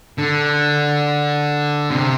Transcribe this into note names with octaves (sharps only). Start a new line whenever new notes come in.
D3
C3